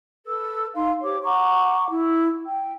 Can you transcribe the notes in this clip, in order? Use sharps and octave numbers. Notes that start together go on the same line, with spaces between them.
A4 B4 E6
D#4 F5 C6
G4 C5 C#5 D6
F#5 A#5 C#6 D6
E4
G5